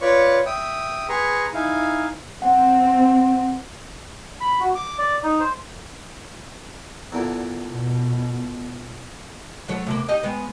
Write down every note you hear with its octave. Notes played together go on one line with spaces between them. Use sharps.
F4 B4 C#5 D5 C#6
E5 G5 D#6
G#4 B4 A#5 C6 C#6
D#4 E4 F5 G#5
C4 F#5
B5
F#4
D6
D5
D#4
C5
E2 A#2 D3
B2
F#3 A3 C#5
C3 A#3
D#4 G4 D#5
G#3 B3